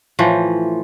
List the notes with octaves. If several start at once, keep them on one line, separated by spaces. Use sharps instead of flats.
A2 E3 F3